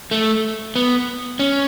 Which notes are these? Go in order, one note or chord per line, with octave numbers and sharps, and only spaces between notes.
A3
B3
C#4